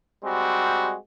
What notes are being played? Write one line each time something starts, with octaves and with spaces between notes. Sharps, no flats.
G3 G#3 C4 F#4